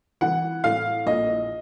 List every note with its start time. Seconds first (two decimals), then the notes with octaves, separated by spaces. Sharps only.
0.21 E3 F#5
0.64 A2 F5
1.06 A#1 D#5